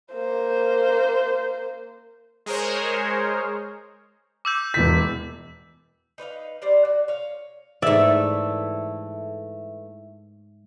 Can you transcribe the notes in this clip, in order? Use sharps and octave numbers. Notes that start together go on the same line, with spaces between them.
A#3 C5
G#3 G#4 A#4 C5 C#5
D6 E6 G6
E1 E3 G6 B6
D#4 B4 D5 F5
G3 C5 D5 F5
F#4
C#5 F5
G#2 E3 A3 D5 E5